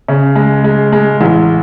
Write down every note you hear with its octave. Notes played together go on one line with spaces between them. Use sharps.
C#3
G#3
G#3
G#3
A1